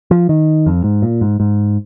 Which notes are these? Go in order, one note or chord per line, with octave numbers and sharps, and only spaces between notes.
F3
D#3
F2
G#2
A#2
G#2
G#2